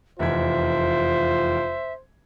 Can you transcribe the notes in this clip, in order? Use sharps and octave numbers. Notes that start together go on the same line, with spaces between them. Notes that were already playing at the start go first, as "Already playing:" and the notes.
F1 E2 F4 C5 E5 G#6